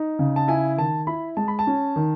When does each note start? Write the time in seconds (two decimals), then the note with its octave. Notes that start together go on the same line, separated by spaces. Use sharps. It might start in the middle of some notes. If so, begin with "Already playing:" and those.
Already playing: D#4
0.19 C#3
0.36 A5
0.48 E4 G#5
0.78 D#3 A5
1.07 E4 B5
1.37 G#3 A5
1.48 B5
1.59 A5
1.67 C#4
1.96 D#3